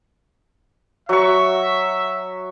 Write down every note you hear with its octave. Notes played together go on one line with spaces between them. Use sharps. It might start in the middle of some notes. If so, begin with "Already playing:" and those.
F#3 E5 C#6